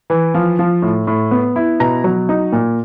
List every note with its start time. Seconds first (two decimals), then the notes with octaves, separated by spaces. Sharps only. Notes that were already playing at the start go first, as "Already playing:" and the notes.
0.10 E3
0.34 F3
0.59 F3
0.82 A2
1.07 A2
1.31 B3
1.56 E4
1.80 B2 A#5
2.04 F#3
2.29 D#4
2.52 A#2